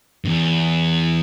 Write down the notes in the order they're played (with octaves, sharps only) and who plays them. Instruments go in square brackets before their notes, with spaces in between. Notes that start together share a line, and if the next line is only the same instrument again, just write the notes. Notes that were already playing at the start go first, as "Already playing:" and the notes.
[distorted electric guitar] E2 G2